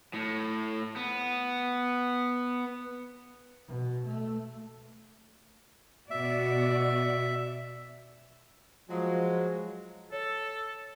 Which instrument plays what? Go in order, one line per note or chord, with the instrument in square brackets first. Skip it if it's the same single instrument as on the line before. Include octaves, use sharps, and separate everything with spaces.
[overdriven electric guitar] A2
B3
[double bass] B2
A3
[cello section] B2 F#4 D5 [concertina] E5
[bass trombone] F3 [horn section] F#3 G#3
[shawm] A4 [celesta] C#5